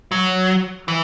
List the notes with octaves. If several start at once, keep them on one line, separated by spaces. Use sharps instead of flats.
F#3
E3